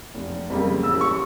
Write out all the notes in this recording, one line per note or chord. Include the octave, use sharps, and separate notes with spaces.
F1
F2 C#3 G3 A#3
A1 E6
C#6